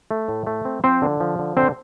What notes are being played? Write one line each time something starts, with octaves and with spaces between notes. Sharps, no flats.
A3
A2
A3
C4
F3 C4 C5
D3
F3
D3
D3 C4 C5